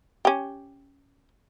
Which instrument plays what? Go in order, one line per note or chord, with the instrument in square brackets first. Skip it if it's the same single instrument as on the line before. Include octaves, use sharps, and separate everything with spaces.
[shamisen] C#4 G4